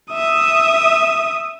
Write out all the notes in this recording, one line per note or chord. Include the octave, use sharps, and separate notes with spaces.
E5 D#6